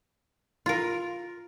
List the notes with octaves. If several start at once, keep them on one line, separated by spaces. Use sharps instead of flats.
F4 A#4